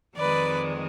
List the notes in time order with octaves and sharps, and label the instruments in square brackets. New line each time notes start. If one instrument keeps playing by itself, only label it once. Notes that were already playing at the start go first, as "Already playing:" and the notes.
[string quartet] F2 D#3 G#3 B4 D5